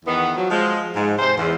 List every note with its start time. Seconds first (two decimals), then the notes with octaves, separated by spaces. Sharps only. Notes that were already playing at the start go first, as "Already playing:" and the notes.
0.05 E2 D#3 B3
0.35 F3 F#3
0.50 F3 G#3
0.96 G#2
1.18 G#2 C3 C5
1.36 E2